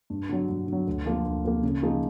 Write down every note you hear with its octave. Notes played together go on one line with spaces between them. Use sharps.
G2
D3 F#3
G2
D3 F#3
D2
D3 F3 A#3
D2
D3 F3 A#3
C#3
F3 A#3 D#4 G#4